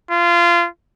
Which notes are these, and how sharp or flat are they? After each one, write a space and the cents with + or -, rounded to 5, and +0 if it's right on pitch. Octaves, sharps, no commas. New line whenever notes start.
F4 -25